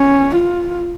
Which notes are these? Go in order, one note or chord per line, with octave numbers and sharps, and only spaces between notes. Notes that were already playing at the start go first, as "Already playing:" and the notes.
Already playing: C#4
F4